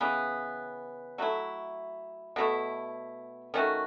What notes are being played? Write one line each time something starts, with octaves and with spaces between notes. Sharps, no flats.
C#3 E3 B3
F#3 A3 E4
B2 A3 E4
D#3 A3 C#4 F#4